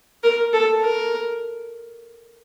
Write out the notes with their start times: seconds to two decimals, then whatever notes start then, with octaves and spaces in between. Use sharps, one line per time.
0.23 A#4
0.53 A4
0.81 A#4